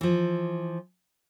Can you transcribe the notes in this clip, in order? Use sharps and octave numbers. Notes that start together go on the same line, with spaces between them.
E3 F3